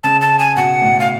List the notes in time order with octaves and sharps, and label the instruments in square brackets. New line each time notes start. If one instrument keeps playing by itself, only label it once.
[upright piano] C#3 [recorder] A5
[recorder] A5
G#5
[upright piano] B2 [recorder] F#5
[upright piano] A2
[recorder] F5